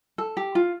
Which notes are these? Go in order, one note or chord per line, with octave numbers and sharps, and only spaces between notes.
A4
G4
F4